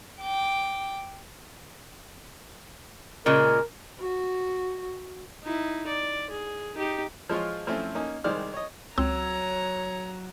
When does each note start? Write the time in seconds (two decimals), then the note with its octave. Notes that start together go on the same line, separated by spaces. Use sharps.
0.21 G5 D6
3.26 A#2 C#3 G#3 A#4
4.00 F#4
5.43 D#4 E4
5.87 D5
6.31 G#4
6.75 D#4 G4
7.29 F3 G#3 F4 C#5
7.67 F3 A3 C4 C#4 E4
7.95 A#3 C#4 D#4
8.24 C2 D#3 G#3 C5 D5 F6
8.54 C#5 D#5
8.98 C#2 F#3 C4 C#5 A#5 E6